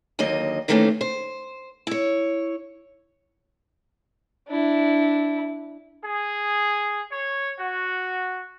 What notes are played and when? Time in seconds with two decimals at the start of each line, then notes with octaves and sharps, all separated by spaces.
0.19 D#2 D3 F#3 A#3 D#5
0.68 C3 D#3 E3 A3 A#3 C#4
1.01 C5
1.87 E4 C#5
4.48 D4 E4
6.03 G#4
7.11 C#5
7.58 F#4